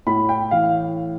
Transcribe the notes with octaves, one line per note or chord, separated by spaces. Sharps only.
A2 B5
G5
E3 F5